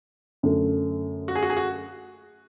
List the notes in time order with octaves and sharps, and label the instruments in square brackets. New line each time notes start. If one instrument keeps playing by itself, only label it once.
[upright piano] F#2 D3 A3
[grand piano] F#4
G#4
F#4
G#4
F#4